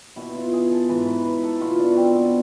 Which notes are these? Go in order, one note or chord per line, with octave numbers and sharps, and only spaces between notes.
B2 E4
F4
G#4
A4
G#2 E3 B4
B4
B4
A4
B2 F4
D4
C4
B3